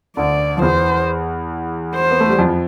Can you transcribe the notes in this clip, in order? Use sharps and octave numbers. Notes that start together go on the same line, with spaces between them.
D2 D3 D5
F3
E2 E3 C5
C5
B3
A3
G3
F2 F3